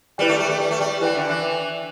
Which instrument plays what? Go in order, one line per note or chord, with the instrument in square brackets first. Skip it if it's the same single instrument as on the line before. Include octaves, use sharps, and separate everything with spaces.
[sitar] G3 [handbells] E4 B4 D5 G5
[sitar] A3
G3
A3
G3
A3
G3
[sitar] E3 [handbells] E4 B4 D5 G5
[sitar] D3
E3